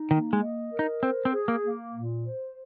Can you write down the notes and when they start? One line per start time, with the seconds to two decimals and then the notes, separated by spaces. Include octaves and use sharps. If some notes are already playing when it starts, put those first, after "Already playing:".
Already playing: D#4
0.11 D#3 A#3
0.33 G#3
0.41 D#5
0.72 A#4
0.79 D#4
1.02 C4 C5
1.25 C4
1.33 G#4
1.48 A#3
1.64 A#3
1.93 A#2
2.25 C5